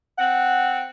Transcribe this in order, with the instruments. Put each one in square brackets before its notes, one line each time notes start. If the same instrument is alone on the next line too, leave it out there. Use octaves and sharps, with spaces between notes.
[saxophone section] C4 F#5